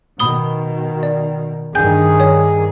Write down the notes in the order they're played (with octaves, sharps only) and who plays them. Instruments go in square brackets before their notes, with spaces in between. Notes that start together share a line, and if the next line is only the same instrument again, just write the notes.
[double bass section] B2 D#3 [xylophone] B5 D#6 G7
[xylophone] D5
[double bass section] G2 D#3 [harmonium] G#4 [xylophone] G5 G#5 G6
[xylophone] C#5